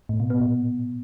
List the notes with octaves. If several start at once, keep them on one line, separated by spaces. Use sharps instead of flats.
A2
B2
B3
A#2